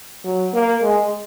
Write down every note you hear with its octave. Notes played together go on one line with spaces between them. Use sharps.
F#3
A#3
G#3